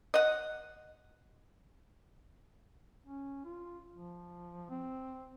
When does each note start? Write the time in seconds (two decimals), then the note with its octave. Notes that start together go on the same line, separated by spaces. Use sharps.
0.14 D#5 F#5
3.06 C#4
3.45 F4
3.95 F3
4.70 C4